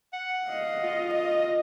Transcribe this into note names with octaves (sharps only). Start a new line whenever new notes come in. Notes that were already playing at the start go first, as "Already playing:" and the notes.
F#5
D#5 F5
F4
D#5